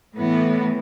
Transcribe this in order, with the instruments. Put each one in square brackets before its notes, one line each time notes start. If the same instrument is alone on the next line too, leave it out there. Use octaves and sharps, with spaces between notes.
[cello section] A2 E3 B3